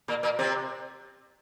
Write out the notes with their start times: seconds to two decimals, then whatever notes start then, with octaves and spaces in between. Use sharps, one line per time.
0.08 A#2 A#3
0.23 A#2 A#3
0.39 C3 C4